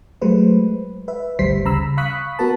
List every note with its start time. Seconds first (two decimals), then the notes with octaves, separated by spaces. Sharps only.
0.22 F#3 G#3 A3 B4 C5
1.08 B4 E5
1.39 G#1 D2 G3 C5 B6 C7
1.65 C#3 A#5 B5 E6
1.97 F5 B5 C#6 D#6 F#6 B6
2.39 B3 F#4 A#4 B4 A5